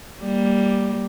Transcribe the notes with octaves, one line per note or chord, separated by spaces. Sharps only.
G3 A#3